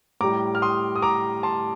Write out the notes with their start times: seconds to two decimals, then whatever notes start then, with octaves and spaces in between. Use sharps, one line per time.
0.21 A2 G3 A#5 D6
0.55 F6
0.62 C6 D#6
0.96 D#6
1.02 A#5 D6
1.43 A5 C6